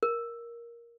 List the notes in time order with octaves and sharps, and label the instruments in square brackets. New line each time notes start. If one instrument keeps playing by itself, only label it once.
[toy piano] A#4